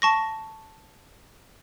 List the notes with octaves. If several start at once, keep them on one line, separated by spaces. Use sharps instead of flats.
A5 C#6 A#6